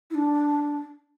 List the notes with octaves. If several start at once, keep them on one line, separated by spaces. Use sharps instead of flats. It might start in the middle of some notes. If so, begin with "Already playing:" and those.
E4
D4